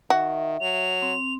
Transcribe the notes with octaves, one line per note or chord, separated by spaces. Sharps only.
D#3 F#4 E5
F#3 F7
C4